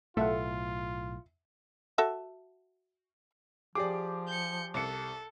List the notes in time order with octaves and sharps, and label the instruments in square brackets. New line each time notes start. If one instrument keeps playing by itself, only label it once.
[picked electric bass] B1 A2 [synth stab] A3 [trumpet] F4 [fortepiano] E5 F#5
[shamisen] F#4 A4 E5
[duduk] F3 [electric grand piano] G4 D6 [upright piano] G#4 D5
[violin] G6 C#7
[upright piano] C2 C#7 [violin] A4